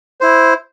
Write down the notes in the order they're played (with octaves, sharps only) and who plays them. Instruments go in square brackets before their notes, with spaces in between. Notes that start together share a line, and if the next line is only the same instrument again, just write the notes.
[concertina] E4 C5